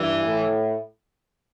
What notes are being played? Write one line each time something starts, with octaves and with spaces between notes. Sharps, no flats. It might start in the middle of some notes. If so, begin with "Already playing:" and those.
Already playing: G2 E3
A2